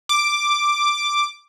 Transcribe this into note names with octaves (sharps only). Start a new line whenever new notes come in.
D6